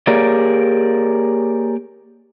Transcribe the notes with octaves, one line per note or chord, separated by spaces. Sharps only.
A#3 G4 G#4 A#4 C#5 D5